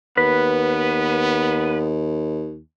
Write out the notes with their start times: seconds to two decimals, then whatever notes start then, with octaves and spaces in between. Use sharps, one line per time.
0.17 D#2 B3 B4